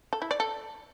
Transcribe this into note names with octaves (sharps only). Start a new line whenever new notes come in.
A4
E4
D5
A4